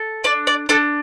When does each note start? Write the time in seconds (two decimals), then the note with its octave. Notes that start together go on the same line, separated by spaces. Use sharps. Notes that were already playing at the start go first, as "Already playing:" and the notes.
Already playing: A4
0.24 D4 D5
0.47 D5
0.69 D4 A4